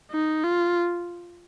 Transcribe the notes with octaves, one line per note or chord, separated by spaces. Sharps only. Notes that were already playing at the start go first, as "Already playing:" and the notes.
D#4
F4